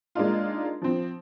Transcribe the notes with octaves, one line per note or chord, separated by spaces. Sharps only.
G#3 A#3 D4 D#4 F4
F3 C4